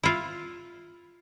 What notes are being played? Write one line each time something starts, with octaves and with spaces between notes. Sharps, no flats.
E4 F4